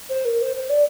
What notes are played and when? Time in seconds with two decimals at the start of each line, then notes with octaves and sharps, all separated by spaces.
0.09 C5
0.25 A#4
0.41 C5
0.56 C5
0.69 D5